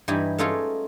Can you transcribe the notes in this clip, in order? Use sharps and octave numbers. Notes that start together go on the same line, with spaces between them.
G2 E3 D#4 G4 G#5 B5
A3 C#4 D#4 F4 G#4 A4